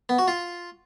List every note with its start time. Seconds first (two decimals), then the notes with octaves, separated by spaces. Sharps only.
0.09 B3
0.18 F#4
0.28 F4